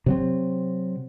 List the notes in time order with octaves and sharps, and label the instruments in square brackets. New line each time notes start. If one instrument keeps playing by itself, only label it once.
[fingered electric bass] C3 F#3 C4